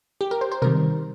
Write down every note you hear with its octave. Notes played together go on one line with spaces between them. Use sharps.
G4
A#4
C5
C5
C3 D#3 G3 A#4